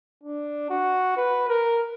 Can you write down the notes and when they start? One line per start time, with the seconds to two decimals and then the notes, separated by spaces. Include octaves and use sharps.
0.24 D4
0.70 F#4
1.17 B4
1.48 A#4